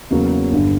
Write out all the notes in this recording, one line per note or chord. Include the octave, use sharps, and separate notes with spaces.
E2 C#3 F#3 A#3
G1 G2 D3